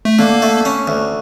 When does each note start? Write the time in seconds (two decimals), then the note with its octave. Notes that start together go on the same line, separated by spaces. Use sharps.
0.05 A3
0.19 D3 A#3
0.42 A3
0.65 C#4
0.88 D2